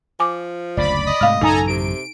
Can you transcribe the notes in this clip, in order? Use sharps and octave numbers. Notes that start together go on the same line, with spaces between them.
F3 G#5 D6
F#1 D2 C#3 D5 B5
D#5
G#2 C3 A3 F5 F6
A1 F#2 C#3 D#4 A4 G#5 A#5
C3 D7